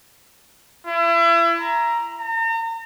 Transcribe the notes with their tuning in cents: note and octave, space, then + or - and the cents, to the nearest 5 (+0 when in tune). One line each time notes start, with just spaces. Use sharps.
E4 +35
A#5 +5
A#5 -40